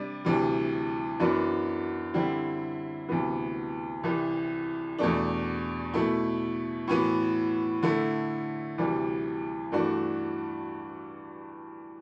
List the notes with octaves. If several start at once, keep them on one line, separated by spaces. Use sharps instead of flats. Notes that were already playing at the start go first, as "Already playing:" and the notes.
Already playing: C3 G3 D4
D2 C3 E3 G3
F#2 E3 B3 D4 F#4
D3 G3 C4 E4
D2 C3 E3 B3
C2 C3 E3
E2 B2 A3 D4
B2 A3 E4
A2 E3 B3 F#4
D3 A3 E4
D2 C3 E3 G3
G2 E3 A3 D4 F#4